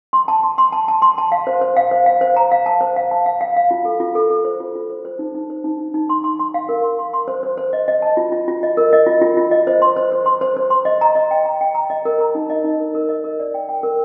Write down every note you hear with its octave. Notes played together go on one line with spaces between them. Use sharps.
C6
A5
C6
C6
A5
A5
C6
A5
F5
C5
C5
F5
C5
F5
C5
A#5
F5
A5
C5
F5
A5
F5
F5
F5
F4
A4
F4
A4
A4
C5
F4
F4
C5
C5
D#4
D#4
C5
D#4
D#4
D#4
C6
C6
C6
F5
A#4
C6
C6
C6
C5
C5
C5
D#5
D#5
A5
F4
F4
F4
D#5
A#4
D#5
F4
F4
F4
D#5
C5
C6
C5
C5
C6
C5
C5
C6
D#5
A#5
D#5
G5
A#5
G5
A#5
D#5
A#4
A#5
D#4
D#5
D#4
A#4
A#4
D#5
A#4
D5
G5
G5
A#4